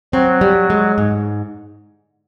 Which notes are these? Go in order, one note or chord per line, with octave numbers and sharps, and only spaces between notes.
F#3 C4
G3
G#3
G#2